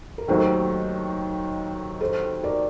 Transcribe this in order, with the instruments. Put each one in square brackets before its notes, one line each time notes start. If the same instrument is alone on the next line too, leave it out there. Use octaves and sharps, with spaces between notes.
[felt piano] A#4
[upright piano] D#2 D#3 F#3 A3 [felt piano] A4 C5
[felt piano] A4 C5
A#4 D5